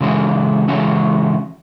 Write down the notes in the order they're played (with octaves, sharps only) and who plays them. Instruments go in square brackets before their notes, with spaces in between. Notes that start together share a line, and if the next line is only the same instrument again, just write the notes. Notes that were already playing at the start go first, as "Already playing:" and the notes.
[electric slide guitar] C#3 E3 G#3 C#4 F#4
C#3 E3 G#3 C#4 F#4